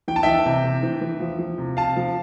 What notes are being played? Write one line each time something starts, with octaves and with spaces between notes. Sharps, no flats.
E3 G5
A5
E3 E5 G5
C3
C3
E3
E3
F3
F3
C3
C3 F5 A5
F3